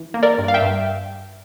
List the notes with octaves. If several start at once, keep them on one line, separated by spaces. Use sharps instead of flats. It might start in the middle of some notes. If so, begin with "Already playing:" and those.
Already playing: E3
A#3
A#4 D5
G2
F5
E5 G5
G2